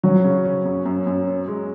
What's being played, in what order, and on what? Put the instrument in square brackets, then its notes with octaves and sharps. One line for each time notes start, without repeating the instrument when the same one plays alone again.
[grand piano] F#3 [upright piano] C#4
[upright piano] C#3
C#4
F#2
F#2
F#2
C#4
G#3